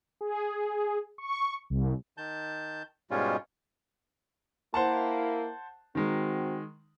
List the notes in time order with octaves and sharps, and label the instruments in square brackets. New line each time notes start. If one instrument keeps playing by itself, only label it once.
[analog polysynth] G#4
C#6
C2
[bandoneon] D#3 A5 G6
G#2 B2 G3 G#3 C#4 F4
[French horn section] A#3 E4 [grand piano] C5 F#5 A5
[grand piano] D#3 G#3 [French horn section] C4 F#4